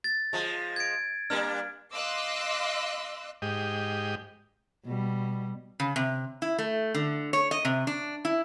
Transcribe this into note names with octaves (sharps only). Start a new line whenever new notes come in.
A6
F3 G#3
G#6 D7
G3 A#3 D4 F6
D#5 F5 C6 D6 E6 F#6
G#2 G4 D#5
B2 G3
C#3
C3
E4
A3
D3
C#5
D#5
C3
D4
E4